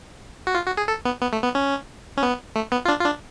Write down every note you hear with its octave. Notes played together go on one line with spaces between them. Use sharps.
F#4
F4
F#4
G#4
A4
B3
B3
A3
B3
C#4
C#4
B3
A3
B3
F4
D4
F4
D4